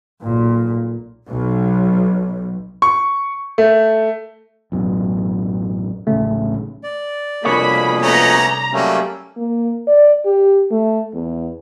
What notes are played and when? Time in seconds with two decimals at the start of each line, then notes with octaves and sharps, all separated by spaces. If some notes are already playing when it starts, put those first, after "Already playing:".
0.22 B1 A#2
1.28 B1
2.82 C#6
3.58 A3
4.72 A1 F#2 B2
6.07 D1 A1 C#3 A3
6.83 D5
7.45 C2 F2 B2 A#3 D4 G#4 C#5 B5
8.02 A3 B3 C#4 A#5
8.73 F#3 G3 A3 A#3 C#4
9.37 A#3
9.87 D5
10.25 G4
10.71 A3
11.14 E2